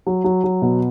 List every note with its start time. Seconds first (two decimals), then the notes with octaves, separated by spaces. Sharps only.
0.07 F#3
0.24 F#3
0.44 F#3
0.62 B2